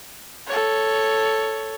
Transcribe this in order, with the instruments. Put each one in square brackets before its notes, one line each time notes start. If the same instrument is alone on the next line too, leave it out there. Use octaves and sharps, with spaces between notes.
[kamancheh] A4 C#5